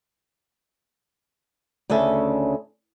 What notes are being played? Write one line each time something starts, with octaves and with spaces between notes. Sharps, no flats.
D2 C#3 C#4 A4 E5